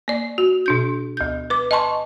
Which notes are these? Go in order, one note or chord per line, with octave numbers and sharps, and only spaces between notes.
A#3 D5
F#4
B2 D4 G6
D2 G6
B4 D6
D#5 G#5 A5 C6 C#6